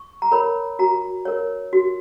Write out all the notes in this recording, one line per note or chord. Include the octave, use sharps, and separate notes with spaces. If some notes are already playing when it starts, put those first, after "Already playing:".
Already playing: C#6
A#5
A#4 C#5 B5
F#4 A#5
A#4 C#5
F#4